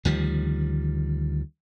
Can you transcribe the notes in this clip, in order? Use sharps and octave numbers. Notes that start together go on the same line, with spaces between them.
D2 D#3 F3 G3